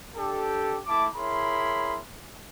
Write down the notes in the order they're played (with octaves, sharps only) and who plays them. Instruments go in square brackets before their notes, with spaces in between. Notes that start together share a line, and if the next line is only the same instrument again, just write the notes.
[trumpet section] D4 G4 A4
A3 E4 A5 D6
E4 G#4 A#4 C#5 B5 C6